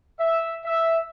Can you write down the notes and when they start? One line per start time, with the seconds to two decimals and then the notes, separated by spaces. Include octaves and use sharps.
0.19 E5
0.64 E5